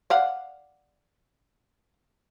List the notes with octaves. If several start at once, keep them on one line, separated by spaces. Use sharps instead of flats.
D5 F5 F#5